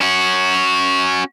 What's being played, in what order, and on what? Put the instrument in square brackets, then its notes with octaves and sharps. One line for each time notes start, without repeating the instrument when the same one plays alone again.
[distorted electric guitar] C#4 F#4